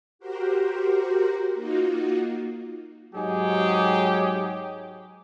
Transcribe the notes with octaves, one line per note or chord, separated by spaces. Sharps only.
F#4 G4 A#4 C5
A#3 D#4 F4 F#4
G#2 F#3 D#4 G4 G#4